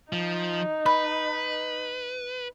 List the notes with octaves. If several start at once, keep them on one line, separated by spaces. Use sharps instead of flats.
F3 D#4
B4 B5